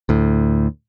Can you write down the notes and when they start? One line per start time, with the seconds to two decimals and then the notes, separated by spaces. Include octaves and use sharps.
0.09 D2 A2